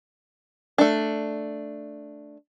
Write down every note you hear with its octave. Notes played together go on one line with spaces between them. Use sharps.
A3 D4